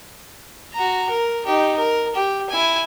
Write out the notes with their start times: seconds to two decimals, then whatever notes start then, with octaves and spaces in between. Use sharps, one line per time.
0.73 F#4 A#5
1.09 A#4
1.46 D#4 G4
1.77 A#4
2.15 G4
2.50 E4 G#5